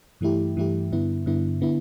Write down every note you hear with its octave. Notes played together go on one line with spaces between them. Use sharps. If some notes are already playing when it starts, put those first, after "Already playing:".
G2 E3 A3 E4 G4
G2 E3 A3 E4 G4
G2 D3 B3 E4
G2 D3 B3 E4
D3 B3 E4